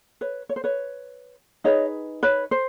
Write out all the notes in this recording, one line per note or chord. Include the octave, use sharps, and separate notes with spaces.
B4 C#5
C#5
C5
B4 C#5
D#4 G#4 B4 C#5 D#5
B4 C#5
C5